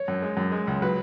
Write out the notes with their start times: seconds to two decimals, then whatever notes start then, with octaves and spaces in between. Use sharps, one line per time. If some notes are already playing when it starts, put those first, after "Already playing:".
Already playing: C#5
0.08 F#2
0.22 G#3
0.37 F#2
0.52 G#3
0.67 C#2
0.82 F#3 B4